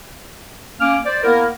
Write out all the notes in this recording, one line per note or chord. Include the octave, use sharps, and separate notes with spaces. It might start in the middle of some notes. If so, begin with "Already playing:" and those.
A#3 C#4 D6 F6
C5 D5
A#3 B3 E4 A#4